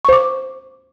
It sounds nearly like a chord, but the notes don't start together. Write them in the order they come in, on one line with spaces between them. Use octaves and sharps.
C#6 C5 D6